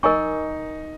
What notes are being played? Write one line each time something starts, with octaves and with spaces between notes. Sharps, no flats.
D#4 A#4 D#5 G#5 C#6